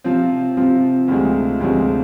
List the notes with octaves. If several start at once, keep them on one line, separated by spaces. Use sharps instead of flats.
C3 F3 C4 F4
C3 F3 C4 F4
D2 C3 F3 G#3
D2 C3 F3 G#3